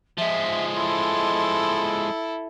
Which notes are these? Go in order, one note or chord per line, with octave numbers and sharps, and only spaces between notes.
F3 G#3 E5
E4 A4 C6